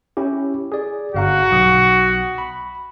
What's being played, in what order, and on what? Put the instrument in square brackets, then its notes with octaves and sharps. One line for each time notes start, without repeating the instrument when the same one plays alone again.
[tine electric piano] C#4 E4 G4
G#4 D5
[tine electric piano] G1 F5 A#5 [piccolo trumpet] F#4
[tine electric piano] B1 D#6
B5